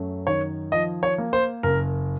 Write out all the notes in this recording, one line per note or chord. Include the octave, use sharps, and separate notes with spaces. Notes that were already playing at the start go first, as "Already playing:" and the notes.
Already playing: F#2 A3
D#3 C#5
F3 D#5
C#5
A#3
C5
F#1 A#4